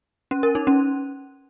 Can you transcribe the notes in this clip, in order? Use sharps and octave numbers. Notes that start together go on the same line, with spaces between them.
C#4
A#4
D#4
C#4